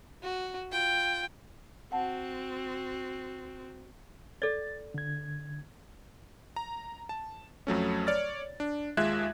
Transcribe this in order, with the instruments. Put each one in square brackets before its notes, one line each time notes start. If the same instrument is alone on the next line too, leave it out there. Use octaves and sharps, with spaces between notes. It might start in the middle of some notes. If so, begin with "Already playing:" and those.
[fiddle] F#4
F4 G5
[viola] C4 F#4 [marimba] F#5 A5
[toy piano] A4 D5 [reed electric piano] A6
[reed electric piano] D3 G#6
[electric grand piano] A#5
A5
F2 F#3 A3 C#4
C#5 D5 F6 A6
D4
D#2 G#3 F4 E5 F#6 G#6